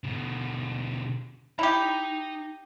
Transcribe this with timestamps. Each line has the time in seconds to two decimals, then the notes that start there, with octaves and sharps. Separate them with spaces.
0.04 B2 D3
1.59 D#4 E4 G4 A#5